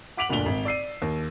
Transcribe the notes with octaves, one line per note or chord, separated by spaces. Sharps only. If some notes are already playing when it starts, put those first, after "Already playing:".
F#5 D6 B6 D7 F7 F#7
F#1 D2 A#2 D4 F7 G7
G#1
D5 E6 C7 D#7
D#2